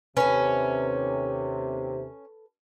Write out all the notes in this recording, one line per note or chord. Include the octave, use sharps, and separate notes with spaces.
D#2 C3 C#4 A4 B4